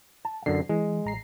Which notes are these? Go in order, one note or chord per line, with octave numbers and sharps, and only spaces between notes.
A5
F#2 D3 C7
E3 G#3
A1 A#5 C7